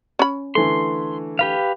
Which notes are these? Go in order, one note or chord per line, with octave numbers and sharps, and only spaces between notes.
C#4 B5
D3 E3 A3 C6
G4 B4 F5